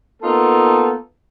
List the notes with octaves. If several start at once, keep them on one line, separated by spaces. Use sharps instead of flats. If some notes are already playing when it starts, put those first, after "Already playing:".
A#3 B3 D#4 F4 A4